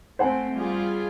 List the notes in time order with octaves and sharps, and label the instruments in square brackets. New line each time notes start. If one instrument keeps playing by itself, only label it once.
[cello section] A3 C4 [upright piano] C5 F#5 G#5
[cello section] G3 F4 G#4